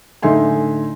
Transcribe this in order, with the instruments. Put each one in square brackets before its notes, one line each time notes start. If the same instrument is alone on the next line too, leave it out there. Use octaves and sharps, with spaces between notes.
[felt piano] A2 D3 D#4 E5 G#5 C6